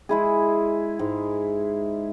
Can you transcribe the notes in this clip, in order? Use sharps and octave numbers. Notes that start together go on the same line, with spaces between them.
G#3 E4 G#4
G#2